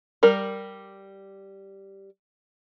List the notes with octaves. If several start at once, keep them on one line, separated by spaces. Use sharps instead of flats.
G3 A#4